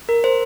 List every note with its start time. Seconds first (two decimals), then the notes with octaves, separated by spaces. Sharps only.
0.09 A#4
0.24 C5